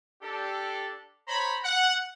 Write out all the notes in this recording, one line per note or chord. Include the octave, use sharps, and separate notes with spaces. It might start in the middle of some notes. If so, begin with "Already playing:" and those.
D4 G4 A4
C5 C#5 A#5 B5
F#5